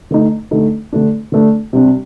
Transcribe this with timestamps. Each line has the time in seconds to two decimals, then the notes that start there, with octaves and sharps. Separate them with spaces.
0.11 D3 A3 D#4
0.51 D3 A3 D#4
0.92 D3 A3 D4
1.32 D3 A3 D4
1.73 C3 G3 D4